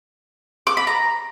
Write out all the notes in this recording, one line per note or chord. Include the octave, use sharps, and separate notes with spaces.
D6
B5
A#5